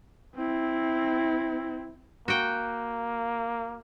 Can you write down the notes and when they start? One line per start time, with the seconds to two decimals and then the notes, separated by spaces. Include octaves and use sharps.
0.35 C4 E4
2.28 A#3 F#4 G5